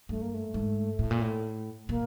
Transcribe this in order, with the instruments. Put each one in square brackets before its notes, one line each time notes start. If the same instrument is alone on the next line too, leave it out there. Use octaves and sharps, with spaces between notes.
[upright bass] G2 [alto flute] A3
[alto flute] A#3
A3
[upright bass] G#2
A2
A#2
A2
[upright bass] A#2 [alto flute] A#3